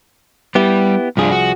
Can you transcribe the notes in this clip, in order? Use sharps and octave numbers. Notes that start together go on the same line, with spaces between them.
G3 B3 E4 G4
C2 G2 F3 D4 F4 G#4
F#4